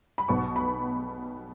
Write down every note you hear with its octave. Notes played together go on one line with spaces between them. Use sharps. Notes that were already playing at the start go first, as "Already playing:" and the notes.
B5
B1 B2 B3 C#6
B5